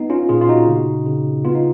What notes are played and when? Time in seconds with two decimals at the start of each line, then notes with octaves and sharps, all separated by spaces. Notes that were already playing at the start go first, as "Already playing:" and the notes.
Already playing: B3 D#4
0.10 C#4 F4
0.29 A#2 F4 G#4
0.41 F4
0.48 D#4 F#4
0.68 C#3
1.06 C#3
1.45 B3 F4
1.55 D#4